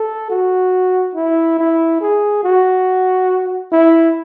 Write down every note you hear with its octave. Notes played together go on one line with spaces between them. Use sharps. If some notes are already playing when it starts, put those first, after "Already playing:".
Already playing: A4
F#4
E4
E4
G#4
F#4
E4